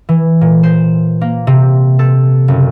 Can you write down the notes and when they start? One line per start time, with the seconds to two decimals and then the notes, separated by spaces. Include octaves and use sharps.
0.09 E3
0.41 A#2
0.63 C5
1.21 A#3
1.47 C3
1.99 A4
2.48 F#1